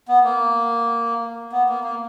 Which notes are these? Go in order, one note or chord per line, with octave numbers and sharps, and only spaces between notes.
B3
A#3
B3
A#3
A#3